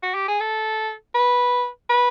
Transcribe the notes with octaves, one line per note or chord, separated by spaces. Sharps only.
F#4
G4
G#4
A4
B4
B4